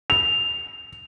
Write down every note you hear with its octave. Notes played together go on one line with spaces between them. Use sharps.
F7